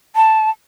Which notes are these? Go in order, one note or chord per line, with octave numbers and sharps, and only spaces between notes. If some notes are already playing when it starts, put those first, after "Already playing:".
A5